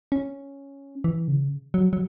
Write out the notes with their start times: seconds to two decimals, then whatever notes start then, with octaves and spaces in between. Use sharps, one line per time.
0.12 C#4
1.04 E3
1.28 C#3
1.74 F#3
1.93 F#3